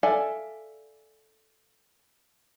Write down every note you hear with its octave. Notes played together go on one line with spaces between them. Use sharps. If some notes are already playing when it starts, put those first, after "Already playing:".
A4 D5 E5 F5 G#5